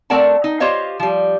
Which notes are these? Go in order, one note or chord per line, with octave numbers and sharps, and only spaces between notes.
A3 C4 A#4 D5 F#5 A5
D#4
F4 G4 C5 C#5 D#5 F5
F3 G3